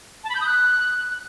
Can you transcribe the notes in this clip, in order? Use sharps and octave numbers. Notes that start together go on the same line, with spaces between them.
A5
B5
G6
D#6
F#6